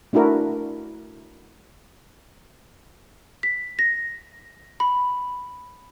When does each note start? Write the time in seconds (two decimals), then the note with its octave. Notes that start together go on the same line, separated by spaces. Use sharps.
0.13 A3 D4 E4 F#4 A#4
3.43 B6
3.79 A#6
4.80 B5